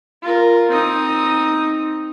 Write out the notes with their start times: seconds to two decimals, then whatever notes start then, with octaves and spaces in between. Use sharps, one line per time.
0.22 F4 A#4
0.70 C4 D#4 D#6